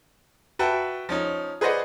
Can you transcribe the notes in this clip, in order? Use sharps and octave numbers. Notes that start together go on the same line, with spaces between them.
F#4 B4 E5 G5 A5
F3 C#4 D#4
G#4 B4 C5 D5 D#5 F#5